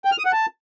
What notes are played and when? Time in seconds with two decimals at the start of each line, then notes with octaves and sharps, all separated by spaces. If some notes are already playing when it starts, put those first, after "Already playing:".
0.05 G5
0.12 F6
0.19 D#6
0.26 F#5
0.33 A5